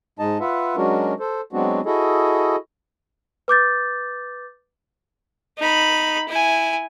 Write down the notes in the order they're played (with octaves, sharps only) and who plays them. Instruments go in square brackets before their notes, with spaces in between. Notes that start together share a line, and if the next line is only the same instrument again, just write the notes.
[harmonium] G#2 G#3 D#4 D#5 A5
F4 B4 E5 F#5
F#3 G#3 C#4 D4 F#4 A#4
A4 C5
F#3 G#3 B3 C4 D4 F#4
E4 F#4 G#4 A4 D#5
[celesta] B4 D6 G6 A6
[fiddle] D#4 B5
E4 G#5